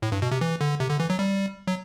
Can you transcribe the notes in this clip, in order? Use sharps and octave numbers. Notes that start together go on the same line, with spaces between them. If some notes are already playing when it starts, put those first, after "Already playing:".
A2
G2
B2
C3
E3
D3
C3
D3
E3
F#3
G3
F#3